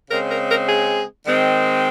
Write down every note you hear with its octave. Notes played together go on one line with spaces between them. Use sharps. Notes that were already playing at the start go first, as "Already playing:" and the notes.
C#3 G#3 C4 A#4
A#4
A#4
G#4
D#3 G#3 C4